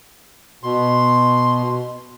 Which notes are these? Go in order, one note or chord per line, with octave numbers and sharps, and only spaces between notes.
B2 C6